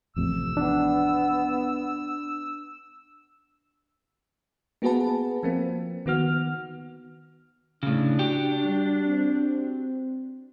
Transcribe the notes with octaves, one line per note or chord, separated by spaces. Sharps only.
A1 F2 C3 E6
B3 D4
A#3 B3 F#4 G#4 B4 A5
F3 A#3 C4
D#3 B3 F#4 F6
A2 C#3 D4
F#4 G4 G5
G3
C4